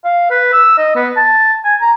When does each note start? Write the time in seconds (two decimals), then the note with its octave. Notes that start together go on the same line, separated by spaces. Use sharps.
0.04 F5
0.30 B4
0.53 E6
0.78 D#5
0.96 B3
1.17 A5
1.64 G#5
1.81 A#5